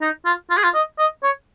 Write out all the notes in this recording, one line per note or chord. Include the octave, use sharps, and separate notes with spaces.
D#4
F4
F4
G#4
F4
D#5
D#5
C#5